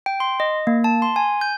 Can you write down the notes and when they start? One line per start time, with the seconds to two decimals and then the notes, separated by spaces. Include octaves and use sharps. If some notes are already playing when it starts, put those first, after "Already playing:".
0.06 G5
0.20 C6
0.40 D#5
0.67 A#3
0.84 A5
1.02 C6
1.16 G#5
1.41 G6